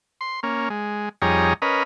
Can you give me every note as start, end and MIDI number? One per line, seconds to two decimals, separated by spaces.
0.21 0.40 84
0.43 0.69 58
0.43 0.69 61
0.70 1.09 56
1.22 1.53 41
1.22 1.53 55
1.22 1.53 63
1.22 1.53 68
1.22 1.53 73
1.22 1.53 82
1.62 1.83 61
1.62 1.83 70
1.62 1.83 71
1.62 1.83 75